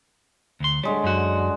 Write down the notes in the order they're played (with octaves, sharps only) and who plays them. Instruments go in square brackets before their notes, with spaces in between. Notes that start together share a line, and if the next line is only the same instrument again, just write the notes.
[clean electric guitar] D2 C6
[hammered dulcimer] D3 G#3 C#5 [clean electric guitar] G3
[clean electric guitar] F#2 F#4